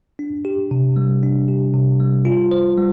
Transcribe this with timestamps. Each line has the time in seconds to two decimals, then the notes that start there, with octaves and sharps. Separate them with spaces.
0.19 D4
0.45 G4
0.71 C3
0.96 G3
1.23 D4
1.48 G4
1.74 C3
2.00 G3
2.25 F4
2.51 C5
2.77 G3